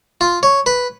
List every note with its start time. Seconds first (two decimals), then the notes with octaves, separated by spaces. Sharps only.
0.21 F4
0.43 C#5
0.66 B4